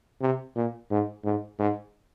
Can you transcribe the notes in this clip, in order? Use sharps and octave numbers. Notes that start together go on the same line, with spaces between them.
C3
A#2
G#2
G#2
G#2